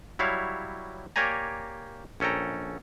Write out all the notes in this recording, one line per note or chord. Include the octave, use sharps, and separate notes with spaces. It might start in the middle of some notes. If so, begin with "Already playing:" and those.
F#3 G3 E4 C#5 F5
A#3 G4 C#5 D5 G#5 A#5
A#1 C#4 A4 G5 A#5